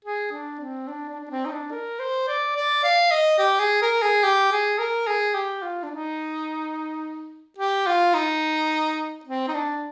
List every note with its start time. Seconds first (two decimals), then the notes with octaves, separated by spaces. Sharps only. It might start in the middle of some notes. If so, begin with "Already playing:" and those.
0.05 G#4
0.32 D4
0.61 C4
0.88 D4
1.09 D4
1.21 D4
1.30 C4
1.46 D#4
1.52 D4
1.72 A#4
1.99 C5
2.28 D5
2.56 D5
2.84 F5
3.11 D#5
3.39 G4
3.60 G#4
3.82 A#4
4.02 G#4
4.24 G4
4.52 G#4
4.79 A#4
5.07 G#4
5.35 G4
5.62 F4
5.83 D4
5.91 D#4
7.58 G4
7.87 F4
8.14 D#4
9.26 C4
9.48 D#4
9.54 D4